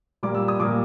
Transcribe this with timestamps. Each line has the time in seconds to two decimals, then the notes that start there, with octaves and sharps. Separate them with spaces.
0.23 A#2 G3 A#3 D6
0.35 E6
0.48 D#6
0.60 A#2 G3 A#3 D6